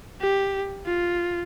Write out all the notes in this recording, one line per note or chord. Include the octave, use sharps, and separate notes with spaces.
G4
F4